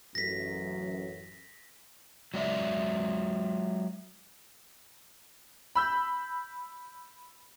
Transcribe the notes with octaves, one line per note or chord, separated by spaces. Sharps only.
A1 F#2 A#6 B6
F#3 G#3 D5 E5
B5 E6 G6